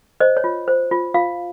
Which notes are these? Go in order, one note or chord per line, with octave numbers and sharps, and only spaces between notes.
C5 D#5
C#5
F4
C5
F4
F4 F5